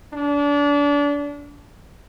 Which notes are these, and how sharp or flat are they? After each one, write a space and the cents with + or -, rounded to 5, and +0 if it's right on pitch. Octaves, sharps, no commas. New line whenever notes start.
D4 -30